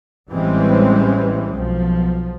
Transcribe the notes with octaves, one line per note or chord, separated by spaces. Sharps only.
A1 E3 G3 G#3 C4 C#4
B1 F3